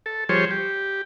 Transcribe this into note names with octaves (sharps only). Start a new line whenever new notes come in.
A4
F3 G3 G#4 C5 C#5
G4